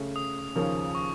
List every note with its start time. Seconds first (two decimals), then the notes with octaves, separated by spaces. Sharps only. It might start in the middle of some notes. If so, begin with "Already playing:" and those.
Already playing: C#3 A3 C#4
0.16 D#6
0.55 D#2 C#3 F3 A#3 C#4
0.95 C#6